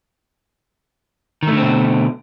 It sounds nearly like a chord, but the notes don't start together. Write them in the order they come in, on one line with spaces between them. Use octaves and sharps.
D#3 A3 D3 C4 B2